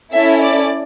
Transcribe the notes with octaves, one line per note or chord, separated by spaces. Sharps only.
C#4 E4 A4 E5
D5